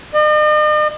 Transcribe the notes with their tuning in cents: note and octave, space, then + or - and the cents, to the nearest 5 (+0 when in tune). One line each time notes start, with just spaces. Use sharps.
D#5 -45